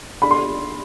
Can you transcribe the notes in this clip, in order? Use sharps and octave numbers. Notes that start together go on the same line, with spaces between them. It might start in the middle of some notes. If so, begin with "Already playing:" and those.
D4 B5
C6